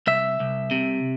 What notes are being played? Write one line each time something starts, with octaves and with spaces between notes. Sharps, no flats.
C2 E5
C2
C3